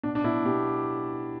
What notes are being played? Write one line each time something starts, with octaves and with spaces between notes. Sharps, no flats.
B2 D4
D4
B2 E4
B2 G4